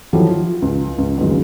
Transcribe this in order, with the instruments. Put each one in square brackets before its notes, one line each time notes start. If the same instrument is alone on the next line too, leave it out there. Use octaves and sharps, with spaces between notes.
[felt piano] D#3 F3 F#3 E4 G4 A4
F4
C#2
C#2
G1 F#2 D#3 G#3